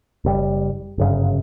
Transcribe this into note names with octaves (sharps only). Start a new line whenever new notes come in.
F#1 A#2 G3
G1 F#2 C#3